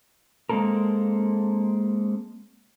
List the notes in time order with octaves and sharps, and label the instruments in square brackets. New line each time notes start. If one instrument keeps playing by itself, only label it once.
[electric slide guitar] G#3 A#3 C4 A4 A#4